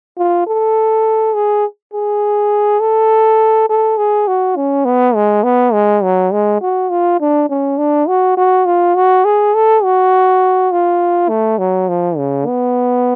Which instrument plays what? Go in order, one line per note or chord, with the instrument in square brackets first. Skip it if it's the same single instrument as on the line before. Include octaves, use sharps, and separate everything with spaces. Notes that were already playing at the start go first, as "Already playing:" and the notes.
[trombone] F4
A4
G#4
G#4
A4
A4
G#4
F#4
C#4
B3
G#3
B3
G#3
F#3
G#3
F#4
F4
D4
C#4
D4
F#4
F#4
F4
F#4
G#4
A4
F#4
F4
A3
F#3
F3
C#3
B3